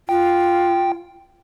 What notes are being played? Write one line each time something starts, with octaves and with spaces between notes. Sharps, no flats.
F4 G5